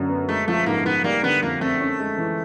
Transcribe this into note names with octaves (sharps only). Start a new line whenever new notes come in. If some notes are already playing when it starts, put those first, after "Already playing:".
Already playing: F#2 D3
B3
G#3 A3
F3 A3
G#2 A#3
G#2 B3
G3 A#3
D3 B3
F2 A#3
A3 C4
C#4
G#3
E3